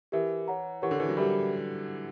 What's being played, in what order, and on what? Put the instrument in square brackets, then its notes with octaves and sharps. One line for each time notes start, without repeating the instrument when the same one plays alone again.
[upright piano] E3 [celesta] G4 A#4 E5
[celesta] C#5 F#5 A#5
[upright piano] E3 [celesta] G4 A#4 C#5 F#5 C#6
[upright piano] D3
E3
F#3
[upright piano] G3 [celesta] G4 A#4 E5 B5